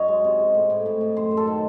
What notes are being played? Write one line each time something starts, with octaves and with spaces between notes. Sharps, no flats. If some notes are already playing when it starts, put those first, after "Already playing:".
Already playing: F#2 C#5 D#5
G#3
C3
G#3
A2
A2
A2
A2
F#2 C5
F#2
A4
D#3